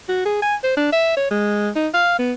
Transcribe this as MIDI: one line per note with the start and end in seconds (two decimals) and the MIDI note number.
0.09 0.24 66
0.25 0.39 68
0.42 0.55 80
0.63 0.76 72
0.77 0.88 62
0.92 1.14 76
1.17 1.29 73
1.31 1.69 56
1.76 1.88 63
1.94 2.16 77
2.19 2.33 59